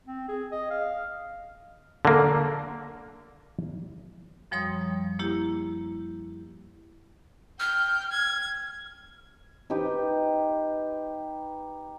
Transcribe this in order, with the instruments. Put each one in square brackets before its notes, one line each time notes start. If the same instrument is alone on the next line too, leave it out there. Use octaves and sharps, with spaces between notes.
[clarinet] C4
G#4
D#5
F5
[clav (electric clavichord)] D3 A#3
[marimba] F#2 F3 G3 C#5 C6 D#6
G3
A#3 E4 G4
[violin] G5 G6 [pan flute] F6
[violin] G#6
[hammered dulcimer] D#4 G4 B4